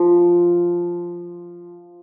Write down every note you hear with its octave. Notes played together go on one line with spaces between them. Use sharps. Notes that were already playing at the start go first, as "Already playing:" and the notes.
Already playing: F3